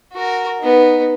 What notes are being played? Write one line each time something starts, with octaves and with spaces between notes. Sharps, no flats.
F#4 A#4
B3 D#4